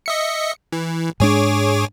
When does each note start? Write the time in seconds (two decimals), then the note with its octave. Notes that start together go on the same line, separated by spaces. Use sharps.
0.06 D#5 E5 C#7
0.72 E3
1.20 G#2 G#3 D4 G#4 C#5 D6